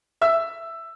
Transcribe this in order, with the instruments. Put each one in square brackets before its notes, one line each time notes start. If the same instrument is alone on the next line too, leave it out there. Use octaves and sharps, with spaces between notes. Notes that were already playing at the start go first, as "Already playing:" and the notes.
[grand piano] E5 E6